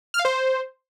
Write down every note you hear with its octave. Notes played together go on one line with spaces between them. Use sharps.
F6
F5
C5